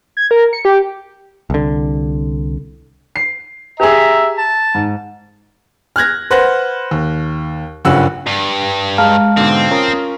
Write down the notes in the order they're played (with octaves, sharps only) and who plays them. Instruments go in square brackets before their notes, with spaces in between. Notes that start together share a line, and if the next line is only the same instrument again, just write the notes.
[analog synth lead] G#6
A#4
C#7
G4
[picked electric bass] C2 D3
[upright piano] C7
[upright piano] G4 G#4 [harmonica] E5 A#5
[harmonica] A5
[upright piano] G#2
[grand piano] F6 F#6 G#6 A#6
B4 C5 F#5 F#6 A#6
D#2
F#1 G2 F3 C#4 F#5 E6
[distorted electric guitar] G2
[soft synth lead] G#3 [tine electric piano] F5 A5 F6 [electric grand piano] A#5
[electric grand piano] G#2 B2 D3 [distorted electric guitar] C4
[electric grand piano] C#4 F4 A#4 [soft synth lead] D#6